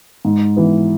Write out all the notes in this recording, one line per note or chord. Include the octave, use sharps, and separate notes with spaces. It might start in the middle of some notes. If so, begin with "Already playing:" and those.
G#2
E3 B3